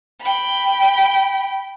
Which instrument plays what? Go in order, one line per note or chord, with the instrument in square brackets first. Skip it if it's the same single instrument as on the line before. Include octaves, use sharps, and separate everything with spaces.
[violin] G5 B5